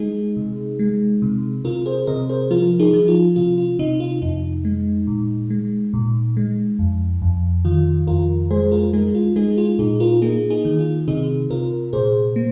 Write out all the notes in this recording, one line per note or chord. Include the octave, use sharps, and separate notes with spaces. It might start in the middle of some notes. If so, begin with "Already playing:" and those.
Already playing: G#3 D#4 G#4
C3
G#3
C3
C3 F4 A#4
G#4 C5
C3 A#4 D#5
G#4 C5
F3 F4 A#4
D#4 G#4
F3
F4
C3 F4
F4
C3 D#4
F4
F2 D#4
G#3
A#2
G#3
A#2
G#3
F2
F2
D#3 F4
F2 F4 A#4
G#3 G#4 C5
F4 A#4
G#3 D#4 G#4
F4
G#3 D#4 G#4
F4
A#2 D#4 G#4
F4 A#4
A#3 D#4 G#4
D#4 G#4
D#3
F4
C3 D#4 G#4
C3 F4 A#4
A#2 G#4 C5
A#3